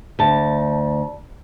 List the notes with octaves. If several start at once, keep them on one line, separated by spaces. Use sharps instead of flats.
D2 A5